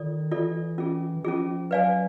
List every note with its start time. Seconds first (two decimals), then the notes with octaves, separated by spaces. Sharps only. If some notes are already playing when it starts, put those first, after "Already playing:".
Already playing: D#3 F4 A4 D5
0.31 E3 F4 A4 D5
0.78 C#4 F4 G#4
1.16 E3
1.24 F3 C#4 F4 G#4
1.71 F#3 B4 D5 F5 G#5